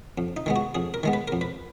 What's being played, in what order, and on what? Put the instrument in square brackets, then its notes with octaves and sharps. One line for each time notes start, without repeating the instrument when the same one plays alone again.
[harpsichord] F2
D#4
D#3 G#3 B3
F#4
F2 G#4
A#4
D#3 G#3 B3
B4
F2 A#4
B4